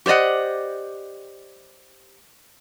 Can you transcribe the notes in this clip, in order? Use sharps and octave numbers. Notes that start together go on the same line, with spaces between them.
G4 C5 D5 D#5 F#5